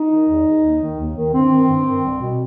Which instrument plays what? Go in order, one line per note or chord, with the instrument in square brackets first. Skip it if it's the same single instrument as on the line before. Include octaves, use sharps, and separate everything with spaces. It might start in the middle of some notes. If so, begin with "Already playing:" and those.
Already playing: [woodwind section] D#4
D#3
E2
D#3
D#2
D#3
D#2
D#3
G2 C4
D#3
G2
D#3
C2
B2